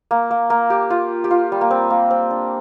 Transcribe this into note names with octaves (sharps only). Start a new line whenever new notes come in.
A#3
A#3
A#3
G4
F4
G4
F4
G3
A#3
C4
A#3
C4
D4